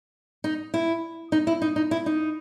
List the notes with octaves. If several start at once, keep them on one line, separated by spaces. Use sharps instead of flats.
D#4
E4
D#4
E4
D#4
D#4
E4
D#4